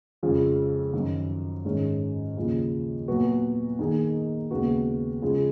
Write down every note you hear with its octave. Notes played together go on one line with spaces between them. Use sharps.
F2 C#3 F3 G#3
F#2 D#3 F#3 C#4
G#2 D#3 G#3 C#4
D#2 C#3 F3
A#2 F#3 B3 F#4
D#3 A#3 D#4 G#4
D#2 C#3 G#3 B3 F#4
C#3 F3 G#3